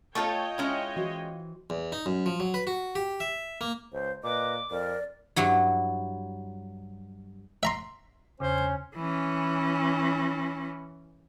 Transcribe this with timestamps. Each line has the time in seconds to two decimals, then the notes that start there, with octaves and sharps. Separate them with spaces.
0.15 A3 F4 A4 C#5 D#5 G5 A5 C#6
0.58 G#3 C#4 E4
0.96 E3 F#4 C5
1.70 E2
1.92 D#4
2.06 F#2
2.26 F3
2.40 F#3
2.54 B4
2.67 F#4
2.95 G4
3.20 E5
3.61 A#3
3.93 C#2 C5
4.24 A#2 B4 D#5 D6
4.71 F2 A#4 D5
5.36 G2 F#3 E4
7.63 E5 A#5 C6
8.40 E2 C#3 C#4 C5
8.96 E3 C#4